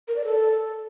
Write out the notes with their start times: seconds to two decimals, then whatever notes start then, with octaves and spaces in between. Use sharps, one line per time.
0.08 A#4
0.16 D5
0.24 A4